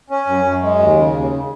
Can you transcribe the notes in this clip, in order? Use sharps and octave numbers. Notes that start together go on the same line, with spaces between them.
C#4
F#2
F#2
G#3
D#2
C#3
D#2